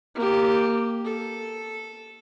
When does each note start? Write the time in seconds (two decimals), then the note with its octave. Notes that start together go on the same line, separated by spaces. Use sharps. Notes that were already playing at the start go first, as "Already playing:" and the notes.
0.15 A#3 G4
1.05 A4